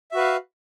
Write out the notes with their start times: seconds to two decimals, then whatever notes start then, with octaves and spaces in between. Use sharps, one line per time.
0.11 E5
0.14 F#4
0.16 B4
0.19 F5